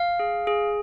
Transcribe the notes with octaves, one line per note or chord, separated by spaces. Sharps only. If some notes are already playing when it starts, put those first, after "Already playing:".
Already playing: F5
G#4
G#4